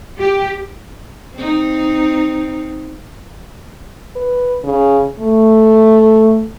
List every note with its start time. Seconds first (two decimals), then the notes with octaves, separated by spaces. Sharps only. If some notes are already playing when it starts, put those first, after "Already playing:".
0.17 G4
1.34 C4 D#4
4.15 B4
4.64 C#3
5.19 A3